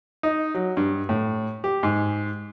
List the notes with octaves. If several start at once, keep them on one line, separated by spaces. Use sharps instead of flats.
D#4
F#3
G2
A2
G4
G#2